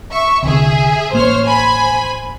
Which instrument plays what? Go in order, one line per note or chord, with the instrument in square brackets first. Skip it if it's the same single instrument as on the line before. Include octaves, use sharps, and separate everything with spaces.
[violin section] E5 C#6
[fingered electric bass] C2 D3 [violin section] G#4 E5
[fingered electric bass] A1 A#3 [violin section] C5 C#5 F6
[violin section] C5 G#5 B5